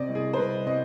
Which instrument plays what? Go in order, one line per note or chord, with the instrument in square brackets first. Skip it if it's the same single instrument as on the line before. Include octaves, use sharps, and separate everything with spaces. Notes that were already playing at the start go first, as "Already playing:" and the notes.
Already playing: [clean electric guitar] C3 [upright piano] D5 D#5
[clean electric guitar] C2
[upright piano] G#4
C5
[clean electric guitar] C2 [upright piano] B4
[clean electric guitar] C3 [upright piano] D#5